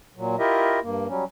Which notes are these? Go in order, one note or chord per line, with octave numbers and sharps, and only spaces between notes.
A#2 F#3
E4 F4 G4 A#4 D#5 E5
G2 A#3
F#3 G3 C#4